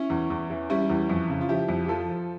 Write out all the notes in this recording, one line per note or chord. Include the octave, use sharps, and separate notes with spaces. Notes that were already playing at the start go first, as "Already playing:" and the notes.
Already playing: C#4 E4
E2
E2
E3
G3 C#4 E4
E2
F2
C#3
F4
F3 E4 G4
F2
G4
F3 F4 A4
F3